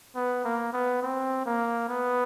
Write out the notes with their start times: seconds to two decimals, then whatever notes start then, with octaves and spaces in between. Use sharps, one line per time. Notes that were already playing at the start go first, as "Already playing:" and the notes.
0.15 B3
0.44 A#3
0.73 B3
1.02 C4
1.46 A#3
1.89 B3